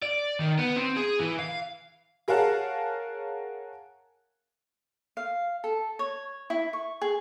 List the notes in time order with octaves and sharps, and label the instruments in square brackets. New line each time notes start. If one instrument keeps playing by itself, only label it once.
[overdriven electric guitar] D5
D#3
B3
C4
G#4
E3
F5
[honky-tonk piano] G#4 A#4 C#5 F5 F#5 A5
[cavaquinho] F5
A4
C#5
E4
C#6
G#4